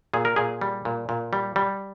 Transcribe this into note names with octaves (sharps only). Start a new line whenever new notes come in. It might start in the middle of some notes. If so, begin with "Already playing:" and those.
A#2 G#4
A#4
A#2 G#4
G3
A#2
A#2
G3
G3